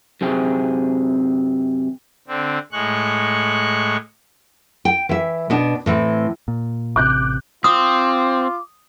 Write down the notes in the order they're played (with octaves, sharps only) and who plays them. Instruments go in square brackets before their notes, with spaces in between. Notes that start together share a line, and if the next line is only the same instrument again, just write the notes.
[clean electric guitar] F#2 C3 C4 G#4
[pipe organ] D3 C4
A2 G#3 C#6 F#6
[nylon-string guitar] G5
E3 E5
B2 B3 D4
A2 E3 C4
[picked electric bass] A#2
[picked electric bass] A1 C3 [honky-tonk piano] D6 F#6 G6
[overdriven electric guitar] C4 [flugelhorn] F4 [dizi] D6 [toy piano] D#6